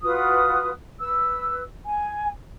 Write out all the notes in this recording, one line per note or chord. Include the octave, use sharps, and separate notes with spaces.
F4 F#4 B4 D#6
B4 E6
G#5